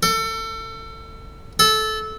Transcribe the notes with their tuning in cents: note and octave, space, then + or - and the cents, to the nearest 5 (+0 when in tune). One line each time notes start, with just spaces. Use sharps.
A4 +30
A4 -15